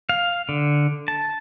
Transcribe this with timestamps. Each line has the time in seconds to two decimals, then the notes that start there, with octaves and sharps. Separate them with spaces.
0.09 F5
0.49 D3
1.08 A5